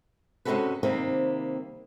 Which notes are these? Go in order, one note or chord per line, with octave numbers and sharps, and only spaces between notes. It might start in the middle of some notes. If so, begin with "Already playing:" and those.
C3 G#3 C#4 F#4 A4 B4
C3 D#3 G3 A#3 C4